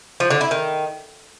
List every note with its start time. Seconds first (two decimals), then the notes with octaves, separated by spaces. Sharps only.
0.20 F3
0.30 D3
0.41 E4
0.51 D#3